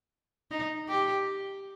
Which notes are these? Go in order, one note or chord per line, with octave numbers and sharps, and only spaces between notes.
D#4
G4